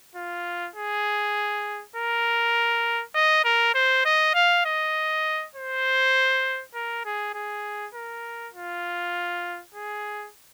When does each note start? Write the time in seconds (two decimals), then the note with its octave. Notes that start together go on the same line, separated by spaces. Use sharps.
0.16 F4
0.76 G#4
1.96 A#4
3.15 D#5
3.45 A#4
3.75 C5
4.05 D#5
4.35 F5
4.66 D#5
5.56 C5
6.74 A#4
7.05 G#4
7.34 G#4
7.95 A#4
8.54 F4
9.75 G#4